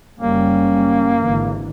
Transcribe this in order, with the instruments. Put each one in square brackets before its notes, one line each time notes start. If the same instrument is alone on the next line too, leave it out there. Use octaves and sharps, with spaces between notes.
[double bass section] F#1 G3 C#4 [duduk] A#3
[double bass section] G#1 D3 E3